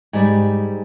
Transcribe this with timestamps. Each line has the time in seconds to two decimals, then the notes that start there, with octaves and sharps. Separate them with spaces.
0.13 G#2 G3